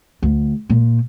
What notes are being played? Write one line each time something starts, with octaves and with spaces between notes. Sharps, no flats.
D2
A#2